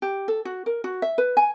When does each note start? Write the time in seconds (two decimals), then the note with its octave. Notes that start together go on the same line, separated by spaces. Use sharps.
0.02 G4
0.28 A4
0.45 F#4
0.66 A#4
0.84 F#4
1.02 E5
1.18 B4
1.37 G#5